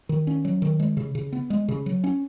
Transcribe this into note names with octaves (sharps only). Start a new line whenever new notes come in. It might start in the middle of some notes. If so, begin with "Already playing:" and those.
D#3
C#4
F#3
D#3
G#3
C#3
C#3
B3
G#3
C#3
F#3
C#4